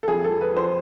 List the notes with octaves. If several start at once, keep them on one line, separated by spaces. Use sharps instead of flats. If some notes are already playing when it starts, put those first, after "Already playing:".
A4
F2 G#4
A4
F3
B4
F3
C5